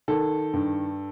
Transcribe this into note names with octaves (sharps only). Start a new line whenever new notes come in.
D#3 A4
G2